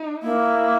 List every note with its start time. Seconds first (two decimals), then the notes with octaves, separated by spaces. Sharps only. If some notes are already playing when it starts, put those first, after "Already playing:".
Already playing: D#4
0.23 A#3 E4